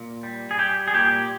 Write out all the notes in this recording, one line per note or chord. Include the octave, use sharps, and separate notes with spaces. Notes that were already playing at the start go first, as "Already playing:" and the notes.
Already playing: A#2
G3
G#4
G3 G4
G#4
A#2 G4